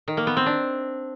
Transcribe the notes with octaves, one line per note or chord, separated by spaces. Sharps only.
D#3
A#3
B3
C4
D4